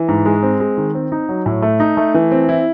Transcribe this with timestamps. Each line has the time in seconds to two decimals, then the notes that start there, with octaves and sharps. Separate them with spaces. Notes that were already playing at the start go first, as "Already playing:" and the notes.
Already playing: E3
0.08 G#2
0.26 G#3
0.43 C4
0.60 G#3
0.77 D#3
0.95 C4
1.12 D#4
1.29 F#3
1.46 A2
1.62 A3
1.80 D#4
1.97 A3
2.14 E3
2.32 C4
2.49 E4